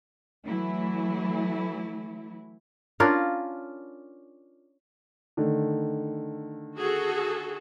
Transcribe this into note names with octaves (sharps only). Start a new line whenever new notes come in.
E3 F#3 A3 E4
C#4 D4 F4 A#4
D3 D#3 A3
F#4 G#4 A4